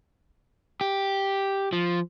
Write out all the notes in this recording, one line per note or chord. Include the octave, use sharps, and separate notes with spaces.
G4
F3